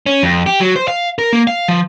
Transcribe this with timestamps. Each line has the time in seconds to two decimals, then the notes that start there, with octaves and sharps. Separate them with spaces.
0.06 C#4
0.23 F2
0.46 G4
0.60 F#3
0.76 C5
0.88 F5
1.19 A#4
1.33 A#3
1.47 F5
1.68 F3